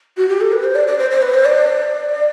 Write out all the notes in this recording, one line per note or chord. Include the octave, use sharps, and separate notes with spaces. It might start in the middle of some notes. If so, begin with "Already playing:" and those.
F#4
G4
A4
B4
C5
D5
D5
C5
C5
B4
C5
D5